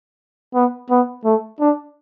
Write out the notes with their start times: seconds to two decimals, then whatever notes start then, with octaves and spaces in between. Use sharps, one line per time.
0.54 B3
0.90 B3
1.24 A3
1.60 D4